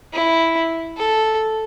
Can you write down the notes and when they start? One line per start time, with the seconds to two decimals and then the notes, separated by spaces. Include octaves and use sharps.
0.13 E4
0.97 A4